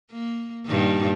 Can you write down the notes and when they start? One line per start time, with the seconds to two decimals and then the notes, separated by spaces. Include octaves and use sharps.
0.11 A#3
0.66 G2 A#2 D#3